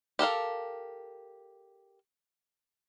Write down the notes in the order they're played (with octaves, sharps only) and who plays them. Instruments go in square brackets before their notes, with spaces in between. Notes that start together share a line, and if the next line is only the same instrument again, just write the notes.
[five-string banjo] G4 A4 A#4 F5